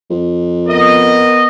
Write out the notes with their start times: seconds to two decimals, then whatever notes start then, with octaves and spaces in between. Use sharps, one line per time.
0.11 F2
0.67 B3 A#4 D#5